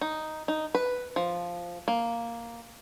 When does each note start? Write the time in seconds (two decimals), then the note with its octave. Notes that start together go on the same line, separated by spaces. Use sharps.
0.01 D#4
0.48 D#4
0.75 B4
1.16 F3
1.88 A#3